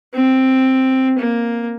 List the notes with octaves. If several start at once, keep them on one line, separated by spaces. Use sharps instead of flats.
C4
A#3